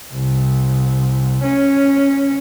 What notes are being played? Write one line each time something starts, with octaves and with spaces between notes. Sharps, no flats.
C2
C#4